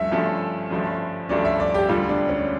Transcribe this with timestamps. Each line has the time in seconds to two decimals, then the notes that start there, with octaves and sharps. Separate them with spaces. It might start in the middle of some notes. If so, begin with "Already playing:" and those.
Already playing: G1 G2 F3 A3 C#4 E5
0.11 G1 G2 F3 A3 C#4
0.70 G1 G2 F3 A3 C#4
1.29 G1 G2 F3 A3 C#4 D5
1.45 E5
1.60 D5
1.74 G4
1.89 E1 D2 D3 G3 F4
2.09 D4
2.29 C#4